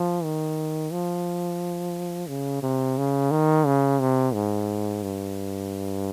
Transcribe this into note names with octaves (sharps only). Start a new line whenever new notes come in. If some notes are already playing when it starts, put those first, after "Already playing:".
Already playing: F3
D#3
F3
C#3
C3
C#3
D#3
C#3
C3
G#2
G2